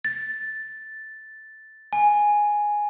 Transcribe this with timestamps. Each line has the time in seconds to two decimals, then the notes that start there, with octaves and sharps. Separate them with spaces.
0.05 A6
1.93 G#5